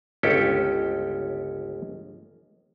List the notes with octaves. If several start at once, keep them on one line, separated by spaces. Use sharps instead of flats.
G1 C#2 C#4 G4 A4 G5